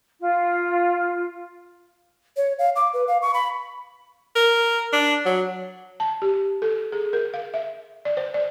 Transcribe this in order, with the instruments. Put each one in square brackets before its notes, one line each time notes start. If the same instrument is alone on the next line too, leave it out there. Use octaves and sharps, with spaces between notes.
[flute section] F4
[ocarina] C#5
F5
D6
B4
F5
C#6
B5
[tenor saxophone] A#4
D4
F#3
[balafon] A5
G4
A4
G#4
A#4
F5
E5
D5
C5
D5